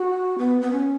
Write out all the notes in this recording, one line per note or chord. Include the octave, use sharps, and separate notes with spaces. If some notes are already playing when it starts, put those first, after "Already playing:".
Already playing: F#4
B3
B3
C#4